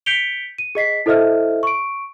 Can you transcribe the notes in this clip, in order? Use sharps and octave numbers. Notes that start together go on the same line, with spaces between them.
G6 B6 C#7 D7 F7 G7
D#7
G#4 D#5 B6 C7
E4 A4 C5 D#5 E5 F6
C#6 D7